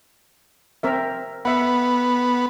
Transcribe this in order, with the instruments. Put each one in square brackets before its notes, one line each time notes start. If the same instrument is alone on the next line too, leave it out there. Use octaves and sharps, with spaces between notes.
[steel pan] C4 A#4 E5
[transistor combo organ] B3 [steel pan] E5 F#5